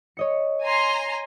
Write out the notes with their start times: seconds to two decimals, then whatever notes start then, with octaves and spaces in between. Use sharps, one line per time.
0.17 C#5 D#5 C#7
0.63 G#5 A#5 C6